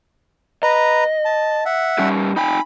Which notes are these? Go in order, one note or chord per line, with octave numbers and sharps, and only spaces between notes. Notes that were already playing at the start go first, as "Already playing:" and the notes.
B4 D#5 A#5
A5
E5 F#5
G3 C#4 G4
D#4 G5 G#5 B5